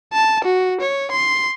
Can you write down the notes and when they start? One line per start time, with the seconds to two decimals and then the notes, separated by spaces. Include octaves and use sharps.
0.13 A5
0.44 F#4
0.81 C#5
1.11 C6